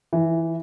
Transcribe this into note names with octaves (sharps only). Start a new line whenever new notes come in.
E3